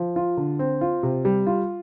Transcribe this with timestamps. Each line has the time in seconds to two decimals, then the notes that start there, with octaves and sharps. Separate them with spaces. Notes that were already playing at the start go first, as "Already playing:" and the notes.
Already playing: F3
0.16 F4
0.37 D3
0.59 C4
0.81 F4
1.03 C3
1.25 G3
1.47 F4